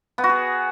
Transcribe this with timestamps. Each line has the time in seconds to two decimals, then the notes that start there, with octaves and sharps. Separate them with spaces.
0.18 B3
0.24 F#4
0.29 G#4